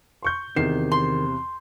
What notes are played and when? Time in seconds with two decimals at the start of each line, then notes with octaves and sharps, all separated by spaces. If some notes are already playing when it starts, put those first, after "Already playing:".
0.22 C6 C#6 G6
0.56 E2 C3 D#3 C7 E7
0.92 C6